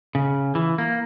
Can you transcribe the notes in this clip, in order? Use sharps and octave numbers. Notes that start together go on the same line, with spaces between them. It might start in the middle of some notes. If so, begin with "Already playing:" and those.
C#3
E3
A#3